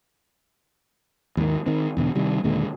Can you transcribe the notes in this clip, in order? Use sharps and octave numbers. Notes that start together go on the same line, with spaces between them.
D#2 G#2 D#3
D#3 C4
E2 B2 D3
C3 D#3 G3
D#2 A#2 D3 G#3